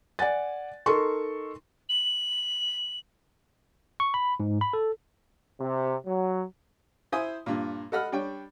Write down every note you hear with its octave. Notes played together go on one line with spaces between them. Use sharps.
D5 F#5 G#5 A6
D#4 A4 A#4 D#5 C6 C#6
F#7
C#6
B5
G#2
B5
A4
C3
F#3
E4 C5 E5 G#5 D#6
G2 A#2
A4 D#5 F#5 B5 F6
G3 D4 C#5 G5